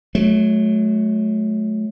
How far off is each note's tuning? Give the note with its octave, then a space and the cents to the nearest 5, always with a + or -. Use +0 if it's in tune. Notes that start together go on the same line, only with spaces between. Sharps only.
F#3 +0 A3 -35